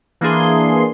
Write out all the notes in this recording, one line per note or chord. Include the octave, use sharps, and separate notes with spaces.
E3 A#3 D4 G#4 C6